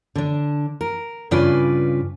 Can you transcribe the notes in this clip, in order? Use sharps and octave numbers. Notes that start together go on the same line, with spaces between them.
D3 D4
A#4
G2 C#3 F4 B4 D5 G#5